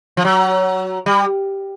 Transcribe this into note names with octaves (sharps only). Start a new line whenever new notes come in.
F3
F#3
G3